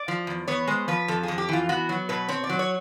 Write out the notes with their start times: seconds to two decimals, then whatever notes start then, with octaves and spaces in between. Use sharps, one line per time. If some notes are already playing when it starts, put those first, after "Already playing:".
Already playing: D5
0.08 F3
0.27 E2
0.48 B3 C#5
0.67 G#3 C5
0.88 F3 B4
1.08 F2 A4
1.23 F2 G#4
1.38 G4
1.49 E3 F4
1.69 B3 F#4
1.89 F#3
2.09 B2 B4
2.29 C4 C#5
2.44 D5
2.50 F#3
2.59 C#5